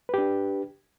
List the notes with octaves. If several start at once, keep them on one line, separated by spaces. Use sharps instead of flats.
D4 G4 B4